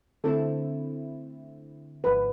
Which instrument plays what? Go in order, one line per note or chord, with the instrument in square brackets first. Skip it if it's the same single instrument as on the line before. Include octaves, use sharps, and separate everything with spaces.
[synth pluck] D3 A3 C4 E4 [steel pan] A4
[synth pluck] G#1 G#2 F3 [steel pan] B4